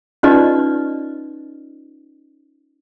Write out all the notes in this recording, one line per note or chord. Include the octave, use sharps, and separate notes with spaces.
C#4 D#4 F4 B4 D5 D#5